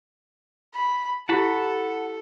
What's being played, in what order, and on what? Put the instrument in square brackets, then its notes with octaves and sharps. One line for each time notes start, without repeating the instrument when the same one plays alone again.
[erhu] B5
[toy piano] E4 G4 [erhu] A4 [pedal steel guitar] F#5 A5 B5